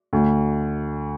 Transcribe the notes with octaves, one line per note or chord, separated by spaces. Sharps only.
D2